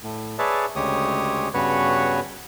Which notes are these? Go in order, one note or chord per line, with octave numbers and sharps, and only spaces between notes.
A2
G#4 B4 C#5 D5 E5 A5
D2 C#3 G#3 G4 C#5 D#6
G2 C#3 B3 F#4 B4 C#5